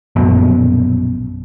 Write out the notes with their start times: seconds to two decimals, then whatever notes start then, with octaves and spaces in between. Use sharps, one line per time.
0.16 A#1 F#2 B2